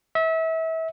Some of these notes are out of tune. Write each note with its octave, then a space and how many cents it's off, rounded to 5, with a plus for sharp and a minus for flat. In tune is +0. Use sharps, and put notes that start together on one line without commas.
E5 -30